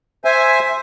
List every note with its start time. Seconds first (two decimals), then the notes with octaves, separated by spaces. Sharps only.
0.25 C5 E5 G#5